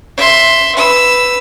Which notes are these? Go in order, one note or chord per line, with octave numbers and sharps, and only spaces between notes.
E5 C6
B4 E6